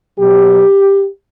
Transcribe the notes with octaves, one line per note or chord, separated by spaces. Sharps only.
B2 F#3 G4